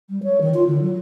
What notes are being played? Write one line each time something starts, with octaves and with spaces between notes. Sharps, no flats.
G3
C#5
D#3
F4
D3
F#3